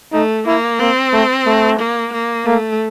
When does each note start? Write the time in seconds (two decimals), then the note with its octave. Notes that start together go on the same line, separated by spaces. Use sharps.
0.12 A3 D#4
0.46 A#3 E4
0.79 A#3 C4
1.13 A3
1.46 A3
1.79 A#3
2.13 A#3
2.46 A3 A#3